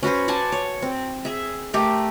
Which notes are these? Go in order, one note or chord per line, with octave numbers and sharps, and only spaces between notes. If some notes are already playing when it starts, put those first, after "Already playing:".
C#4 F#4 B4 C5
D5 F#5 G#5 A5
C#5
C4
G#4 E5
A3 G4 A#4